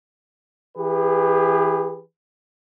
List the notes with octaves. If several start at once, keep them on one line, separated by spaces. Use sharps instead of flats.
E3 G4 G#4 B4